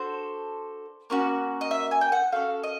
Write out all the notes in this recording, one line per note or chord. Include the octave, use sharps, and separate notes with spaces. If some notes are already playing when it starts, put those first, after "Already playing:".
Already playing: D4 F#4 A4 C5
A#3 C#4 F#4
D#5
E5
G#5
G5
F#5
C#4 F#4 A4 F5
D#5